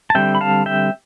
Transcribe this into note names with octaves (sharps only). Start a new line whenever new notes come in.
A5
D3 G3 C4 E5 G5
B5
F5 A5
E5 G5